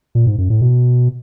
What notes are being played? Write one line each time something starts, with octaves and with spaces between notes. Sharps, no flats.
A#2
G#2
F#2
A2
B2